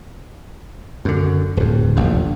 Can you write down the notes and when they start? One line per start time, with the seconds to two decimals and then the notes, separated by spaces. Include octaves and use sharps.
1.05 F#2 D3
1.57 D1 F2
1.96 F1 A#1 D#2